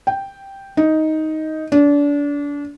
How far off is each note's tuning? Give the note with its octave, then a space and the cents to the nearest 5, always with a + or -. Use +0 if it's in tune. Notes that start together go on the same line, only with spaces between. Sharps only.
G5 +0
D#4 +10
D4 -30